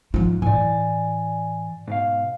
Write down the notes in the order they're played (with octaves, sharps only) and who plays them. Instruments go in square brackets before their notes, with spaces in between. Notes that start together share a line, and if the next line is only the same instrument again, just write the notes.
[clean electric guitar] G#2 [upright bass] F3 F4
[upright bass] A2 E3 [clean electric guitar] D5 G#5
[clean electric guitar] G#2 B2 F5